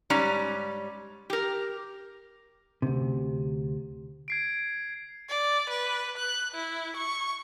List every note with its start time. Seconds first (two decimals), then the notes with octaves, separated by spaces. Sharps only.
0.10 G#2 G3 C#4 D5 A#5
1.30 G4 A#4
2.82 D2 C3
4.28 G#6 C7 D7
5.29 D5
5.69 B4
6.18 F#6
6.54 E4
6.97 C#6